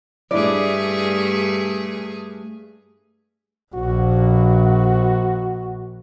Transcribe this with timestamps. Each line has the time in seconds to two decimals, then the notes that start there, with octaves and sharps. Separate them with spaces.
0.31 G2 A3 D4 E4 G#4 D5
3.74 A#1 F#4